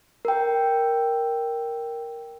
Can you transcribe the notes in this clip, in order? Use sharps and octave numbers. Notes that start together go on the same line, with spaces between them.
A#4 G5